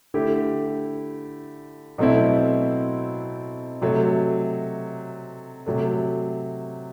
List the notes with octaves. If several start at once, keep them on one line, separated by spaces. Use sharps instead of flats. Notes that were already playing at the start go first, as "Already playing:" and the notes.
D3 A3 E4 G4
B2 F#3 A3 C4 E4
C3 F#3 A3
C3 F#3 A3